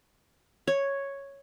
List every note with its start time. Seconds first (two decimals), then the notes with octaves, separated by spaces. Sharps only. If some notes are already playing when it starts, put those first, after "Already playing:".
0.67 C#5